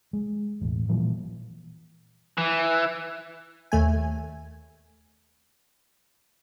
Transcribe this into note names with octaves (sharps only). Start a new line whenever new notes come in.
G#3
E1 A1
A#2 E3 F3 G3
E3
D#2 A3 G#5